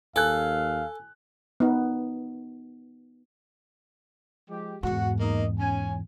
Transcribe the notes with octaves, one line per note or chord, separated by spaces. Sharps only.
D#2 A4 F5 G#5 F#6
B3 D#4
F3 G#3 G4
E2 G#2 F#4 F#5
A#3 D#4 D#5
C#4 G#5